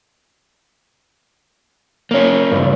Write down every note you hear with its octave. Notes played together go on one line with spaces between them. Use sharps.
A#3 C#4
C#2 G2